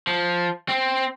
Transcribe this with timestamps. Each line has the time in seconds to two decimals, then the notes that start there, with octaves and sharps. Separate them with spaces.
0.07 F3
0.68 C4